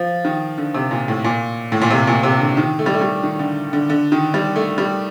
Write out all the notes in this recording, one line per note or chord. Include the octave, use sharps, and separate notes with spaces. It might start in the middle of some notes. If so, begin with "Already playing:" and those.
Already playing: F3
D#3
D3
C3
A#2
A2
A#2
A2
A#2
C3
A#2
C3
D3
D#3
A3
G3
A3
G3
D#3
D3
D3
D3
D#3
G3
A3
G3